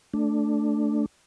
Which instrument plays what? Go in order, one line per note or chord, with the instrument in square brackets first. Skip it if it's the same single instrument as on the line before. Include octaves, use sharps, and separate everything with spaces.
[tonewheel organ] A3 D4